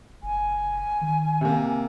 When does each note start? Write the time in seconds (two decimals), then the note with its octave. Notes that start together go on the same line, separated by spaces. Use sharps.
0.23 F#1 G#5
1.01 D#3
1.41 C3 A#3